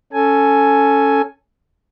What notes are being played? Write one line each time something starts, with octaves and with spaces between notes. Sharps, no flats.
C#4 A4 G#5